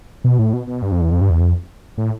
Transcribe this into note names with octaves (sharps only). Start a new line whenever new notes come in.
B2
A2
B2
B2
G2
F2
E2
F2
G2
E2
F2
A2